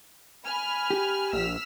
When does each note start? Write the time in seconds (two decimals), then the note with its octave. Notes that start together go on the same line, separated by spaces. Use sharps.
0.47 G#5 B5 F6
0.90 G4
1.33 A#1 E6 F6 B6